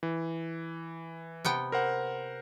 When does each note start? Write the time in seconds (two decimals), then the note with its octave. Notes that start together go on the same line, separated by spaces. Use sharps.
0.03 E3
1.45 C3 B3 G5
1.72 A#4 C5 F#5